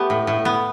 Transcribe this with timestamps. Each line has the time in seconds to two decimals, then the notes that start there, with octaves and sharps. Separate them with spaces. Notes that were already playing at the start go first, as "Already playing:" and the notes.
Already playing: A3 B3 G4
0.10 A2
0.27 A2
0.45 B3